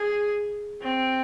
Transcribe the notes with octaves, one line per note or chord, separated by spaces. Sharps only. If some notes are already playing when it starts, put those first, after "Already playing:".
Already playing: G#4
C4